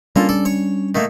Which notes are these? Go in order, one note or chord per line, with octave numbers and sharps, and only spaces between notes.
G3 A#3 C#4 D4 F4 A4
A4 D5
C#5 C#6
D#3 A3 A#3